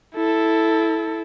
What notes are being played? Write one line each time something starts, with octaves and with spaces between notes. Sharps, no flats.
E4 A4